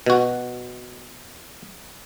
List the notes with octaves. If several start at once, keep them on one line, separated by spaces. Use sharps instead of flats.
B2 F#4